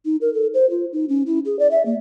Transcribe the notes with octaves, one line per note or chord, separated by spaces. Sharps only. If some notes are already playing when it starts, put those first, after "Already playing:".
D#4
A#4
A4
C5
F4
D#4
C#4
E4
G#4
D5
E5
A#3